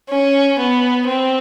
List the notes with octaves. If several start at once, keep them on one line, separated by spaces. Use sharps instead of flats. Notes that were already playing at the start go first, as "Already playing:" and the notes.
C#4
B3
C4